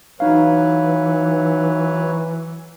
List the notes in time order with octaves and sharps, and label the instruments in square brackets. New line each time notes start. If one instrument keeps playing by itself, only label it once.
[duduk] E3 [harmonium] F#3 B4 C#5 [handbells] D#4 F5